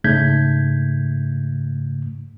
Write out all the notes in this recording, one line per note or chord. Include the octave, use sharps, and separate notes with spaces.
G#2 C#3 A3 G6 G#6 B6